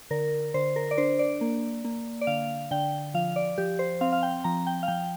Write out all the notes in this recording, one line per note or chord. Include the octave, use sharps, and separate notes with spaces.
D3 A#4
D3 C5
A#4
D5
D4 C5
D5
A#3
A#3
D5
D3 F5
D3 G5
F3 F5
D5
F3 G4
C5
C4 F5
F5
G5
F3 A#5
G5
F5
F3 G5